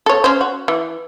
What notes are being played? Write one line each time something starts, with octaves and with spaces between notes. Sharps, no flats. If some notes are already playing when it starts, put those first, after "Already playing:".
A4 C#5
C#4 C5
F#4
E3